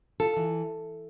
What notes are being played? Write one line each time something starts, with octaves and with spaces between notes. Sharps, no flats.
F4 A4
E3